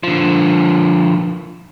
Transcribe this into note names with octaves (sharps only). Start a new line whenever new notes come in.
D3 F3